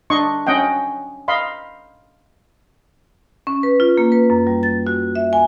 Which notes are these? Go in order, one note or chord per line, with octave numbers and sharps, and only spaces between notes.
D4 D#5 C6 C#6
C#4 D#5 F#5 G5
D#5 F5 B5 C6
C#4
B4
F4
A#3
B4
F#2
G3
A6
F#4
E5
G#5